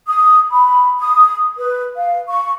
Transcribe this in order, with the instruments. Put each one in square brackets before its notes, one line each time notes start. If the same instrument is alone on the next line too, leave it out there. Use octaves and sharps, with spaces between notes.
[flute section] D#6
B5
D#6
B4
F5
C#6